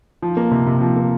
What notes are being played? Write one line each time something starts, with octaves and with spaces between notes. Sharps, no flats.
F3
A#3
C3
C3
F3
A#3